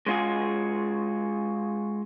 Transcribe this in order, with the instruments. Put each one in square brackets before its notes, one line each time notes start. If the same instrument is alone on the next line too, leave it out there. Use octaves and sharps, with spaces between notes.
[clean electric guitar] G#3 C#4 F4 F#4 G#4